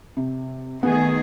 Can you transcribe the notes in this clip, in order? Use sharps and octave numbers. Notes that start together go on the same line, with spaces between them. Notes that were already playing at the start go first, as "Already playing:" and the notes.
C3
D#3 A3 B3 G#4